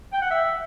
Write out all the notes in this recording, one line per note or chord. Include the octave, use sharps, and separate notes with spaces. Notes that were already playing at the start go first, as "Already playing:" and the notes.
G5
F#5
E5